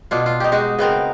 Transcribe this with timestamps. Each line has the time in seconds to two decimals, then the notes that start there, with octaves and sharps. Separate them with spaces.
0.11 B2 D4 F4
0.26 F4
0.40 D#4 G4
0.52 G#3 D#4 F#4
0.79 C#3 B3 C4 A#4